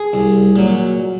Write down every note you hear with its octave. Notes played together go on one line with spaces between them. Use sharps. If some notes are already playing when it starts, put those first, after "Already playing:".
Already playing: G#4
C2
A#2 F#3